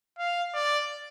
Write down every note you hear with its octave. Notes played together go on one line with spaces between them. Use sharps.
F5
D5